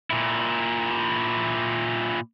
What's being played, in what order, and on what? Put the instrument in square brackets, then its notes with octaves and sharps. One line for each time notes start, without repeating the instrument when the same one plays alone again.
[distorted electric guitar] A#2 E4